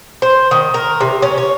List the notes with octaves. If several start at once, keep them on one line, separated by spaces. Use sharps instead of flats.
C5
D#3
A#4
C3
C#4
C#5